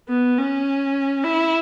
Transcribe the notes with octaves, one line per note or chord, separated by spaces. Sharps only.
B3
C#4
E4